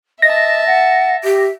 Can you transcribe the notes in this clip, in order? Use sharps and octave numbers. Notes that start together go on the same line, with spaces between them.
D#5 E5 A5 A#6
F#5
G4 E5